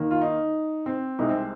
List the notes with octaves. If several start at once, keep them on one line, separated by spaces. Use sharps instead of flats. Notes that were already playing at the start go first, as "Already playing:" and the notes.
Already playing: D#2 D#3 A#3
F4
D#4
C4
C2 C3 G#3 C4 D#4
C4